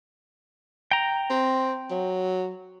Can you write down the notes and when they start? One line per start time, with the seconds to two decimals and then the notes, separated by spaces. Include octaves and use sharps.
0.91 G5 A#5
1.30 C4
1.91 F#3